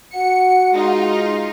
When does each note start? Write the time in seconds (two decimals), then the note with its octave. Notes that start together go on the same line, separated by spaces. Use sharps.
0.14 F#4 F#5 C#7
0.73 G#3 D#4 F4